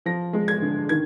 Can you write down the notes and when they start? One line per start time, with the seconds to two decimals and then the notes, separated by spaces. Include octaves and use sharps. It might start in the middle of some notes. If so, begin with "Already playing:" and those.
0.06 F3 A#6
0.33 G#3
0.48 G#6
0.62 D3
0.89 D#3 G#6